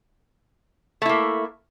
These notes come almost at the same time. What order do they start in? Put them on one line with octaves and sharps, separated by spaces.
A3 E4 A#3